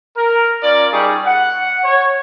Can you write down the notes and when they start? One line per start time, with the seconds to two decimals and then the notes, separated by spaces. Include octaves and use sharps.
0.17 A#4
0.63 C#4 F4 A#4 D5
0.92 G3 D#4 G4 G#4 C#6
1.26 F#5
1.85 C#5